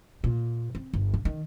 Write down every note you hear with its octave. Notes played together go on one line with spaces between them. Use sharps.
A#2
C4
G1
D3
D#3